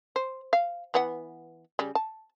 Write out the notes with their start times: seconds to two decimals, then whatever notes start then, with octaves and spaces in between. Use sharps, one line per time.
0.16 C5
0.53 F5
0.94 E3 B3 F#5
1.79 C#3 G3
1.95 A5